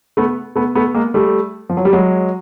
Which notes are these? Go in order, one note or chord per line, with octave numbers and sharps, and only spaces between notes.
A3 B3
A3 B3
A3 B3
G#3 A#3
G3 A3
F3
F#3
G3
F#3 G#3